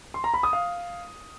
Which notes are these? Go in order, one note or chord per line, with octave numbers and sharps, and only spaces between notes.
C6
A#5
B5
D#6
F5